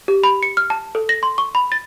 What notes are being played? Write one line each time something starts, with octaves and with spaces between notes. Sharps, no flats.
G4
B5
C#7
F6
A5
A4
A#6
C6
C#6
B5
A6